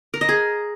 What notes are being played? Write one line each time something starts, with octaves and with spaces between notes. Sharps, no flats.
A#4
D#5
G#4